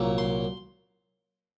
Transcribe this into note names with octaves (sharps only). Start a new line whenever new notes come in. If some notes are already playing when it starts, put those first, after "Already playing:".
Already playing: C2 A#2 F#3 A#3
C6